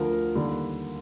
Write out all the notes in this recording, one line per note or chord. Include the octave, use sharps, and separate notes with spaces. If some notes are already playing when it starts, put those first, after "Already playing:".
Already playing: D2 D3 F3 A#4
D#2 D3 G3